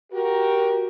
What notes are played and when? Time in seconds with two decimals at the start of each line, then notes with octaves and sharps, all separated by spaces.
0.12 F#4 G4 A#4